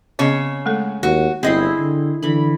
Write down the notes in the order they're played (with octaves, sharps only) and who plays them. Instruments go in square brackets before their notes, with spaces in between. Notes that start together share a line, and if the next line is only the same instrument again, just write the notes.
[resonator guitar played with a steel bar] C#3 C#5 [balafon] B3 C4 D#5
[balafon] G#3 A3 A4
[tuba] D#2 [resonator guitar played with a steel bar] F#4
[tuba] G1 [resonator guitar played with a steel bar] C4 D#5 [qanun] E4 G#4
[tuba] D3
[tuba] D3 [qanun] E3 B5